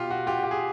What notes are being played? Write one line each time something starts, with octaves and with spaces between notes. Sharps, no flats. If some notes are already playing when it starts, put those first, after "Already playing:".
Already playing: B2 F4 G4
F#4
F4 G4
G4
G#4